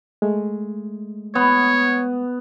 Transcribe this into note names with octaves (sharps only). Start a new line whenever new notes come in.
G#3 A3
B3 C#5